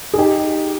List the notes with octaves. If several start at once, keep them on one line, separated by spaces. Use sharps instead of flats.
G#4
D#4 G4